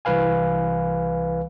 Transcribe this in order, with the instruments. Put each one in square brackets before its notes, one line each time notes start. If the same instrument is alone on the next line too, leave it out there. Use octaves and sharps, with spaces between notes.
[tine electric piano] C2 E3 B4 F5 G#5